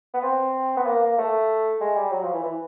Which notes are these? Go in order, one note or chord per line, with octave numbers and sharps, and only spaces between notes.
B3
C4
B3
A#3
A#3
A3
G#3
G3
F#3
F3
E3
E3